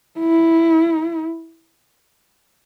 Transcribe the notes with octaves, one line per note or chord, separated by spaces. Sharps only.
E4